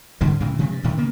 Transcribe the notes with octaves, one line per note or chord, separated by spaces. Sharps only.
G#2 D3 G3 G#3
D2 A2 C#3 G#3
C3 F3 G#3 C4
G2
D2 A2 D#3
C#3 A#3 B3